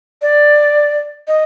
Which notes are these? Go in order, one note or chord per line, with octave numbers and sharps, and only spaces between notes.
D5
D#5